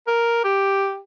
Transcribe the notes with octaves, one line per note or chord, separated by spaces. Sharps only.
A#4
G4